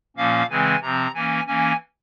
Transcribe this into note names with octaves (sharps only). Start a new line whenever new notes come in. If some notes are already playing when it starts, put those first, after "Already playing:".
A#2 F3 A#3 C#4 F5
C#3 E3 G#3 C4 G#5
C3 F3 C4 A#5
E3 A#3 C#4 G#5
E3 A#3 C#4 G#5